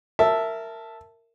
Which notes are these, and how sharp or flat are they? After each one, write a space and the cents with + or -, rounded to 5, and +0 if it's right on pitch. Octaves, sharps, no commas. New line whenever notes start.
A#4 -20 E5 +0 A5 +0